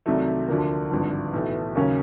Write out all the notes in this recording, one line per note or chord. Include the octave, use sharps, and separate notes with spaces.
C2 C3 D#3 F#3 A3
D2 D3 F3 A#3
G#1 G2 D3 F3
B1 A2 E3 A3
D#2 C#3 F#3 A#3 C#4